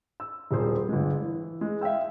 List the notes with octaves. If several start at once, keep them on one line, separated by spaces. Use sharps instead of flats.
E6
D#1 G3 C4 G#4 C5
G1 G#3
E3
G#3
E5 F5 G5 E6